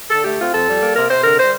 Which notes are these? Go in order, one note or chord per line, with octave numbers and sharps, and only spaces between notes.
D3 A4
A3 G4
C4 F4
F2 A4
G3
A#3
C3 A#4
C3 C5
D3 A#4
G3 C5